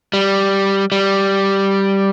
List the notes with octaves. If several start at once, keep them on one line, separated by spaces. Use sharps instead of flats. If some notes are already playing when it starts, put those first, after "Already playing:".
G3
G3